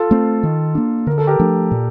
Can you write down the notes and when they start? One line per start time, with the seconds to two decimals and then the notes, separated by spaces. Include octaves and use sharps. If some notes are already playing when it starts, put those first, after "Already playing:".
Already playing: F4 A4
0.11 A3 C4
0.43 D#3
0.75 A#3 D4
1.07 D3 A#4
1.18 A4
1.27 G4 A#4
1.40 F3 A3 D4
1.71 A#2